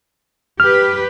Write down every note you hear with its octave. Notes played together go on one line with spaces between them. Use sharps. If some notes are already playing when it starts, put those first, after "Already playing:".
G4 B4 F6